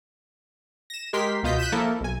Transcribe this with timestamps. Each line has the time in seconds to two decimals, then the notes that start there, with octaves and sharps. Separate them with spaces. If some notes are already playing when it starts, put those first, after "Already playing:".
0.90 A#6 E7
1.13 G#3 G4 A#4 C6 B6
1.43 C#2 B2 F4 D#5 G6 B6
1.59 F#6 G6 B6 D#7 E7
1.72 F3 A#3 E4 A4 A#4
2.01 B1 G#5